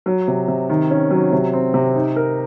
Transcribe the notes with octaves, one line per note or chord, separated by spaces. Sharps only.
F#3
C3
C3
D#3
C#4
F#3
C3
C4
C3
D#4
A#4